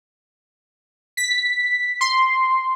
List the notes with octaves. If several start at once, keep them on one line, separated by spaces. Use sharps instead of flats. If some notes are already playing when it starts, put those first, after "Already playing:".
B6
C6